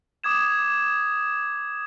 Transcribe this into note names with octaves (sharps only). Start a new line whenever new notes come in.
D6 D#6 G#6 E7